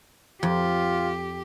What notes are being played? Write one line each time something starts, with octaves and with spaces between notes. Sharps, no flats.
F2 F4 G4